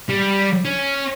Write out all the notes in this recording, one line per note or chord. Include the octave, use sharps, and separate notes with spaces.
G3
C#4